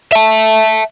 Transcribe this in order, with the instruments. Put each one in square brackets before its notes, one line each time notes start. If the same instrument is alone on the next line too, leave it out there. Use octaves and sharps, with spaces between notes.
[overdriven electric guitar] E5 A5